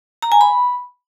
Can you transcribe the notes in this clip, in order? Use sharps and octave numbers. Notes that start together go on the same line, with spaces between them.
A#5
G#5
B5